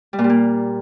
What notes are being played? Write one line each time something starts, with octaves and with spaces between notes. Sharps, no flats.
G3
A#2
G3
A#3